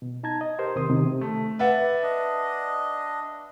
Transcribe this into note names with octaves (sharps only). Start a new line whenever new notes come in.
B2
D#4 A5 A#5 G#6
D#5
G4 A#4 C5
D#2 C3 C4 C6 D#6
C3 D#3
A3
B4 D5 E5 F#5
D4 D#5